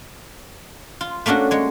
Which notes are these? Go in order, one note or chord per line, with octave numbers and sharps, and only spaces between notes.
F4
A3 A#3 C#4 D4 F#4
G#3 C#5